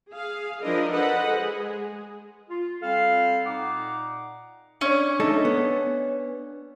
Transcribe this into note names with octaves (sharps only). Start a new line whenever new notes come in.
G#4 F5
F3 D4 E4 A#4 D#5
A4 B4 C5 D#5 F#5 B5
G#3 G#4
F4
G3 C4 A4 F5
A#2 D#4 F#5 D6
C#4 D4 D5
A3 D#4 A4
B3